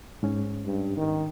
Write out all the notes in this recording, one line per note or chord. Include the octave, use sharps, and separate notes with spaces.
G#2 C#4
G2
D#3